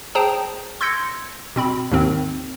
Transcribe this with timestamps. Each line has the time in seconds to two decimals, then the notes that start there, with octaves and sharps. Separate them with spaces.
0.15 G#4 C5 G5 A5 A#5 D#6
0.81 C6 E6 G6 G#6 A#6 C#7
1.56 B2 C4 B5
1.91 D#2 G#2 D#3 C4